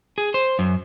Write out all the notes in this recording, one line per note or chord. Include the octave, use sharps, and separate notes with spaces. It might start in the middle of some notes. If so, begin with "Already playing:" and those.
G#4
C5
F#2